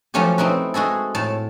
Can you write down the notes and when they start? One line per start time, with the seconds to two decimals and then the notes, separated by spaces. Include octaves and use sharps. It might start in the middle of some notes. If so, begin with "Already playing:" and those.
0.14 F3 F#3 A3 C#4 F4 G4
0.38 C4 D#4 E4 B4
0.74 G#3 F#4 G#4 A4
1.15 A2 A5